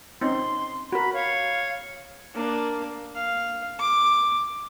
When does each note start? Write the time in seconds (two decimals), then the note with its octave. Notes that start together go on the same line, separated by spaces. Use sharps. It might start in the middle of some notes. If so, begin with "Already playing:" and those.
0.21 C4 C#4 D#4 C6
0.92 F#4 A#4 B5
1.14 C#5 F5
2.34 A#3 D4
3.15 F5
3.79 D6